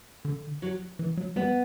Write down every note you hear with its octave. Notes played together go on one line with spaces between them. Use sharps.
D3
F#3
E3
F#3
G3 B3